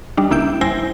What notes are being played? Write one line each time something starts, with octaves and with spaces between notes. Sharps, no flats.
G3 D4 D#4
C#2 A#3 E4 E5 G6 D7
G1 E4 C5 G5 G#5 A#6